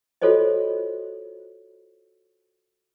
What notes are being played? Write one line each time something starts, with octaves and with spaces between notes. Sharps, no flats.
F4 F#4 A4 C5 C#5 D#5